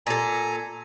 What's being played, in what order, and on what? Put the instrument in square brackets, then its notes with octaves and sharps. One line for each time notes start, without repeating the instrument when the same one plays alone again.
[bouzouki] A#2 A4 [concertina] G#5 A#5